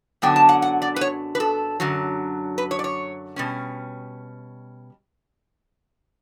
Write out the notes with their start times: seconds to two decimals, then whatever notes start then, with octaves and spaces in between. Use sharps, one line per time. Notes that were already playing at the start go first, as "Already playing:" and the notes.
0.22 F#2 D3 F#3 B3 D4 G5
0.36 A5
0.49 F#5
0.62 F#5
0.82 D5
0.96 B4
1.01 C#5
1.35 B4
1.40 A4
1.80 F#2 D3 F#3
2.58 B4
2.71 C#5
2.79 D5
2.84 C#5
3.36 B2 G3 C#4